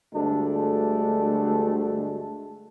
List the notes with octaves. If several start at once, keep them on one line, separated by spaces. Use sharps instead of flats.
D2 G2 D3 G#3 A3 D4